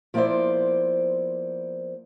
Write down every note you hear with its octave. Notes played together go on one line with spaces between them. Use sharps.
F3 A#3 B3 E4 C5 D5